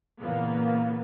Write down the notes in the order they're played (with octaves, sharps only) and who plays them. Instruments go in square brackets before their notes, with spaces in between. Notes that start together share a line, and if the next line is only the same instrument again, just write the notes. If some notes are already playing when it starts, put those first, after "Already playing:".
[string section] A#2 C#3 E3 A#3 B3